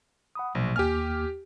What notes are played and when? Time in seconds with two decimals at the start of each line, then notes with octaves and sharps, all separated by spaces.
0.35 F#5 B5 D#6
0.55 A#1 B2 F#3
0.76 D#2 A#3 G4 G#5 F6